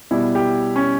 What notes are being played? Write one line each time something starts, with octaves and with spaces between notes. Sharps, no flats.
B2 G3 E4
G4
C#4